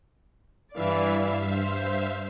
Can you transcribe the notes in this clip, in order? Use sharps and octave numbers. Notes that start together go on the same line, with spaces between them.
G2 E3 D5 E5 F5
C5